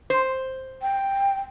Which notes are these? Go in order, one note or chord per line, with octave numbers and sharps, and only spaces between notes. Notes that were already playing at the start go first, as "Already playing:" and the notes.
C5
G5